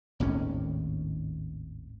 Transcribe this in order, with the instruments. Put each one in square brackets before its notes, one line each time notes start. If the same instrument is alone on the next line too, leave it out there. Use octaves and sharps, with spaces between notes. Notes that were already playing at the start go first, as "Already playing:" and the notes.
[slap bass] G#1 D#2 A2 C#4